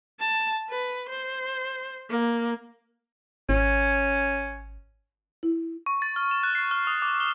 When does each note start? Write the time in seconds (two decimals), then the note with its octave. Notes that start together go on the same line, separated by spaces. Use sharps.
0.19 A5
0.70 B4
1.09 C5
2.10 A#3
3.49 G#1 C#4
5.43 E4
5.86 C#6
6.02 A6
6.16 F6
6.31 E7
6.43 F#6
6.55 C7
6.71 F6
6.87 D#6
7.02 D6
7.20 G7